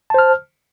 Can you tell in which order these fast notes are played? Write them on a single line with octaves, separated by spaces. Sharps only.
A5 C5 F6